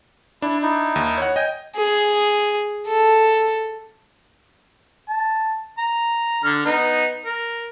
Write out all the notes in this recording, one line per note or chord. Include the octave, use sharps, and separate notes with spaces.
D4 E4
D#4 E4
D#2
C#5 F#5
D#5 G5 G#5
G#4
A4
A5
A#5
D3 F6
B3 D#4
A#4